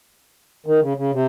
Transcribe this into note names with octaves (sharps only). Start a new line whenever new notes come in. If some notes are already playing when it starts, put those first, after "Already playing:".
D#3
C#3
C#3
C3